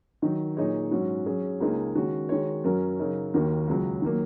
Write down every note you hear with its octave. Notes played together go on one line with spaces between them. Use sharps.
D#3 F#3 D#4
A#2 F#3 D#4 G#4 C#5
G#2 F#3 C#4 F#4
F#3 C#4 G#4
C#2 C#3 A#3 D#4 G#4
D#3 G#3 C#4 F#4
D#3 G#3 F#4 C#5
F#2 F#3 C#4 F#4 A#4
C#3 F#3 D#4 A#4
D#2 D#3 A#3 F#4
C#2 C#3 F#3
D#3 F#3 A#3